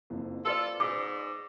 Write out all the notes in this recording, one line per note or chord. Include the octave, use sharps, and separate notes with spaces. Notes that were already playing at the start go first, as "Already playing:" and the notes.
F#1 F2
F4 A4 B4 C5 D5
G#2 D6